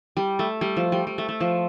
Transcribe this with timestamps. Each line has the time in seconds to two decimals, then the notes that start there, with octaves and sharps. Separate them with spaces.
0.17 G3
0.39 A3
0.61 G3
0.77 F3
0.92 G3
1.07 G3
1.18 A3
1.29 A3
1.40 F3